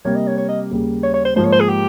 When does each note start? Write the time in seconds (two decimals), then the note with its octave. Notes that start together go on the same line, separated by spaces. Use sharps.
0.05 C3 G3 A#3 C#5
0.15 D#5
0.27 C#5
0.38 C#5
0.48 D#5
0.71 D#2 C#3 G3 A#3
1.03 C#5
1.14 C#5
1.25 C5
1.36 G#2 F3 A#3 C5
1.45 C#5
1.52 C5
1.60 G#4
1.69 G4